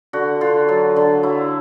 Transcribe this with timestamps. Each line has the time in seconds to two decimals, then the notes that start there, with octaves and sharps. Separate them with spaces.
0.13 D3 F#4
0.41 D3 F4
0.68 F#3
0.96 D3
1.23 F#3 E4